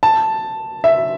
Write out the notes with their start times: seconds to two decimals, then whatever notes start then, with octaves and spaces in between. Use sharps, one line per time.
0.03 A5
0.84 E5